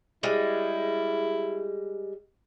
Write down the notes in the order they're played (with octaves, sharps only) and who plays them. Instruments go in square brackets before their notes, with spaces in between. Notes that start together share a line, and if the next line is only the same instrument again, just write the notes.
[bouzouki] G3 G#3 [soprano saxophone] E4